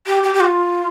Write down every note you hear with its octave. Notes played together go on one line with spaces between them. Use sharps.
G4
G4
G4
F4